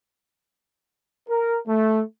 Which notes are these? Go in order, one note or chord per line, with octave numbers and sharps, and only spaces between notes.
A#4
A3